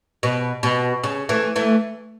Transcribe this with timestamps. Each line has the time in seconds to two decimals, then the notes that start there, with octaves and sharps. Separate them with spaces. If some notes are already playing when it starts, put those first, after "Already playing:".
0.23 B2
0.63 B2
1.04 C#3
1.29 E3 A3
1.56 E3 A3